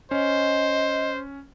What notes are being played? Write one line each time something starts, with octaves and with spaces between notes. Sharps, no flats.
C#4 C5 D#5